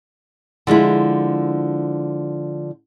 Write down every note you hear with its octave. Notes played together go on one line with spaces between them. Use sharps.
D3 F3 G#3 E4